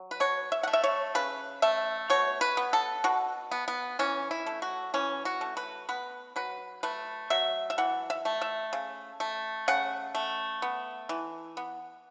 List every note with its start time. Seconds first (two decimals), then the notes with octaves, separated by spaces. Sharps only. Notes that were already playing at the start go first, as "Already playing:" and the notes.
Already playing: F#3
0.11 B4
0.20 B2 C#5
0.52 E5
0.63 F#5
0.68 A3
0.73 E5
0.84 C#5
1.15 C#3 B4
1.62 A3 E5
2.10 B2 C#5
2.41 B4
2.57 B3
2.73 A4
3.04 B2 F#4
3.51 B3
3.68 B3
3.99 E3 C#4
4.31 E4
4.46 A3
4.62 F#4
4.94 E3 C#4
5.25 F#4
5.41 A3
5.57 B4
5.89 B3 B4
6.36 F#3 B4
6.83 A3 B4
7.30 F#3 E5
7.70 E5
7.78 E3 F#5
8.10 E5
8.25 A3
8.41 E5
8.73 C#3
9.20 A3
9.68 C#3 F#5
10.15 A3
10.62 B3
11.09 E3
11.57 B3